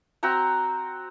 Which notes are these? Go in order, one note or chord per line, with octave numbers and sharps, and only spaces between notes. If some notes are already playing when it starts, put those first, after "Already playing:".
C4 F#4 G5 A#5